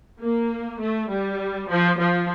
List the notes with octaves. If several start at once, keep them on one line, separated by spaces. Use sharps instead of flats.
A#3
A3
G3
F3
F3